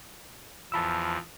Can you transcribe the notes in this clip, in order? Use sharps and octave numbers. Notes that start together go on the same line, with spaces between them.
E2 F3 A5 B5 E6